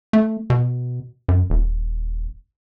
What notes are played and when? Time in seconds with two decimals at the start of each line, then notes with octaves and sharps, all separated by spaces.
0.13 A3
0.50 B2
1.28 F#2
1.50 D#1